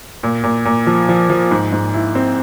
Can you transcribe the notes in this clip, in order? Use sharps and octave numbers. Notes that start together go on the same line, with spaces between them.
A#2
A#2
A#2
F3
F3
F3
G#2
G#2
E4
C4